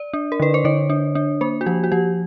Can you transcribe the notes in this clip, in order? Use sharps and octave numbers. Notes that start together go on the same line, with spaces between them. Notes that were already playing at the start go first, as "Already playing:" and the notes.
Already playing: D5
D4
A#4
D3 B4
C5
D3 C#5
D4
D4
A#3 C5
F#4
F3 G4
F#4
F3 G4